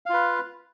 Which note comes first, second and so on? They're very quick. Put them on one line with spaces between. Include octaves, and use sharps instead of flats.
F5 F4 B4